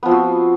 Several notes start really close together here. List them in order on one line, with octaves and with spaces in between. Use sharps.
B3 F3 C4 F#4